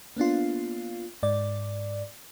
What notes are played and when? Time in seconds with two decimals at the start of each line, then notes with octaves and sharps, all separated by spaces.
0.17 A#3 B3 D4 F4
1.23 G#2 D5